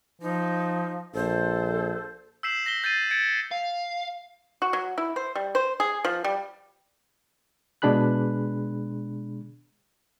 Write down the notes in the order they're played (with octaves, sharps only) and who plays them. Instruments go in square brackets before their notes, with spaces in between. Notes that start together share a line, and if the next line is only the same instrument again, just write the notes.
[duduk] F3 [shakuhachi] D#4
[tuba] A#1 [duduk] A4 [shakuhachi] C5
[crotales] E6 G6 B6 C7 E7 F#7
A#6 B6 G7
G6 A6 C7 D#7
G#6 A6 C#7 D7
[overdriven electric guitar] F5
[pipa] F#4
F#3
E4
C5
G3
C5
G#4
F3
G3
[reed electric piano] B2 G#3 D4 G#4 B5 F#6